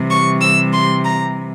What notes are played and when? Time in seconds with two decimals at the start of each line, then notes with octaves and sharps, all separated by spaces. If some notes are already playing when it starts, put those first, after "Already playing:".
Already playing: C3 E3 G3
0.10 C#6
0.41 E6
0.73 C6
1.04 A#5